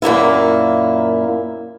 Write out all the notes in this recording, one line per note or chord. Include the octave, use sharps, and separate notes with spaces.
F#2 A#2 A#3 E4